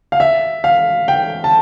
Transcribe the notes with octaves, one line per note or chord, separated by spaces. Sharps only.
F5
E5
F5
G5
A5